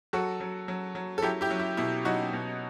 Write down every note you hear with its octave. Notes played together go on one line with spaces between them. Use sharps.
F#3 F#4 A4
F#3
F#3
F#3
A4
F#3 E4 G4
E4 G4
F#3
E4
B2 E4
F#3 D#4 F#4
B2